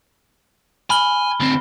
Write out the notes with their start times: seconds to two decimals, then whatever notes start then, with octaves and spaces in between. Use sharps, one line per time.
0.90 G#5 B5 F6 G7
1.40 D2 C4